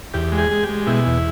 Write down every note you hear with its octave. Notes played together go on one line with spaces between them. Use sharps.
E2 G4
G#3
G#4
G#3
G4
G#3
B2 E4
E2